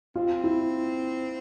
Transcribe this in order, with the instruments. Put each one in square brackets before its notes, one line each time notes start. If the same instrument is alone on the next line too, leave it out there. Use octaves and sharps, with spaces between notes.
[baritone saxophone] C4 [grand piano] F4
[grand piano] E4